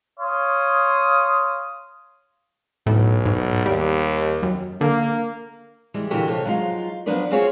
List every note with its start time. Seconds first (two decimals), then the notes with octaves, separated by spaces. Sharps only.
0.20 C#5 F5 C6 D#6
2.86 B1 A2
3.26 G#2
3.66 D#2 G3
4.43 F#2
4.81 D3 A#3
5.94 E3 G3 G#3
6.11 A#2 D3 E3 F#4 G4 E5
6.28 C3 F3 A4 C#5
6.44 F3 F#3 G#3 D#4 F4
7.06 F3 F#3 B3 D4 B4 D5
7.31 C4 F4 F#4 G#4 C#5